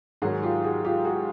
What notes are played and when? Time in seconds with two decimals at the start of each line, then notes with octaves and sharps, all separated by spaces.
0.22 G#2 D#3 F#3 F#4 G#4
0.43 F4 G4
0.64 F#4 G#4
0.85 F4 G4
1.04 F#4 G#4